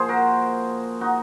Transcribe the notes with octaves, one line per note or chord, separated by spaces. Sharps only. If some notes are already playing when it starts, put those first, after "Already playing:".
Already playing: A#2 F3 G#4 C5
F#4 A#4
D#4 F#4